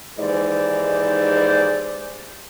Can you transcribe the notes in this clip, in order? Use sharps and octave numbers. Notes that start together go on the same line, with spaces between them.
D#2 G#2 E3 G#4 C5 D5